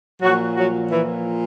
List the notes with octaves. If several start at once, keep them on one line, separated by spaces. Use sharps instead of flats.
A#2 F3 F#3 F#4
F#3 F#4
E3 E4